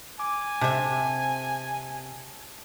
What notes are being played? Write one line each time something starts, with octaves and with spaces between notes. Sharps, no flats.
G#5 D6
C3 E5 A5